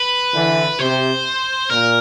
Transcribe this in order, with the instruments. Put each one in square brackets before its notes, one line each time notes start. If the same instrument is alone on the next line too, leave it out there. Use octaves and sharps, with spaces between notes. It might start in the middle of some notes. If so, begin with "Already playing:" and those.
Already playing: [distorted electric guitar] B4
[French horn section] D3 E3
[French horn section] C3 [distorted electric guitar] C5
[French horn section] A#2 [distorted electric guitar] A#4